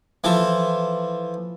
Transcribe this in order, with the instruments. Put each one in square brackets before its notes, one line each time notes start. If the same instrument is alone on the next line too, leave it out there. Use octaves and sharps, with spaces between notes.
[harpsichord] E3 F3 A4